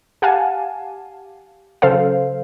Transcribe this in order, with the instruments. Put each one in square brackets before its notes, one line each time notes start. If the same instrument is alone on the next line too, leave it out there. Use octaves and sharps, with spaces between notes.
[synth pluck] G4 F5 F#5 G#5 A5
C#3 F#3 A4 C5 F5